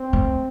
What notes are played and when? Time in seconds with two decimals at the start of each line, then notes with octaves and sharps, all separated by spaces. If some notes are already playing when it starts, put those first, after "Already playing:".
Already playing: C4
0.13 A3